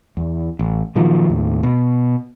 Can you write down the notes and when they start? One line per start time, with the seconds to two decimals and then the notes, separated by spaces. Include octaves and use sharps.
0.17 E2
0.59 A1
0.95 A#2 D#3 F3 F#3
1.29 D#2 A2
1.63 B2